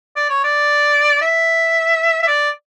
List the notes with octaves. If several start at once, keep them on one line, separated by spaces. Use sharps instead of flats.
D5
C#5
D5
E5
E5
D5